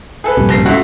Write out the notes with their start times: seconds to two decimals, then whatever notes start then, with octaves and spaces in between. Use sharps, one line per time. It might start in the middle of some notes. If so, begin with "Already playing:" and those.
0.24 G#4 A4 B4
0.37 A#1 G2 C3
0.49 F#1 A#6 C7
0.66 C#2 A3 F#4